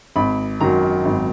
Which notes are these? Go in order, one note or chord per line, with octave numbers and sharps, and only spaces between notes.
G#1 B5
F#2 D#3 F#3 A#5
G#1